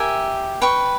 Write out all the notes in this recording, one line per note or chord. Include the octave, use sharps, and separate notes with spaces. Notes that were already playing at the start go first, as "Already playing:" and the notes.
Already playing: G4 A#4 E5 G#5
B4 G5 C#6